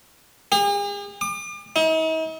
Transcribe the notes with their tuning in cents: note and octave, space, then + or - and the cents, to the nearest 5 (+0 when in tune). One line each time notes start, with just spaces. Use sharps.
G#4 -45
D6 +40
D#4 +45